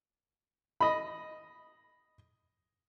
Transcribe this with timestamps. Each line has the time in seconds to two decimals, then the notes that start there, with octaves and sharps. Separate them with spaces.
0.81 D#5 B5